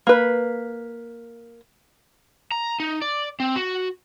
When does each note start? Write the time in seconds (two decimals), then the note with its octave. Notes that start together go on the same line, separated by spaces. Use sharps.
0.07 A#3 B4
2.52 A#5
2.80 D#4
3.02 D5
3.40 C4
3.56 F#4